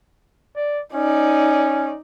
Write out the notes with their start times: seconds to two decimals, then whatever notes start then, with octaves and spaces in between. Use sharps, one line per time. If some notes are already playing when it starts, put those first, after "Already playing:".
0.56 D5
0.94 C#4 D#4 D5